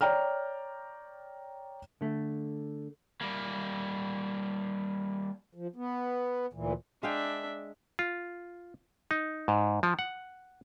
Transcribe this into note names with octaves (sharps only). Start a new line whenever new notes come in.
C#5 D5 G5 A#5 F6
D3 A3
G3 A#3
F3
B3
D2 A#2 E3
G#3 D4 E5 F5 G5
F4
D#4
G#2
F3
F#5